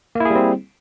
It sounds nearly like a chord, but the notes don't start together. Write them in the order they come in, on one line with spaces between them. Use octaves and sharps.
A#3 E4 G#4 G3 C4